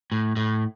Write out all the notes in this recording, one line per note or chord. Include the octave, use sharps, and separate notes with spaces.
A2
A2